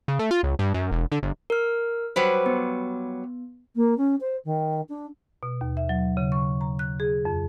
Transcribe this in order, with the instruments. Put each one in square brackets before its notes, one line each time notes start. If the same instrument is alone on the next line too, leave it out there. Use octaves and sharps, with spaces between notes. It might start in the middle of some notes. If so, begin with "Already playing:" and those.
[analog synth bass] C#3
A3
F4
C#2
G2
F#2
E1
D3
G1
[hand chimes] A#4 F6
[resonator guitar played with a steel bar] F#3 G3 B4 [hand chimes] C5
[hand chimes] B3
[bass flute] A#3
C#4
C5
D#3
D4
[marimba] B2
D#2
E5
F#3
C#3
C#6
A#5
F#6
G#4
F2